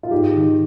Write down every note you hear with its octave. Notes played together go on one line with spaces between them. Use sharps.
F4
G#2 G4
D#3